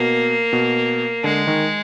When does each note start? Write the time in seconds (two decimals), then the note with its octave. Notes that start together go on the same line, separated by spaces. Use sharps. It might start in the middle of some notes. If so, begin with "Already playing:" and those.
Already playing: B2 A#3
0.53 B2
1.24 D3 G#3
1.47 D#3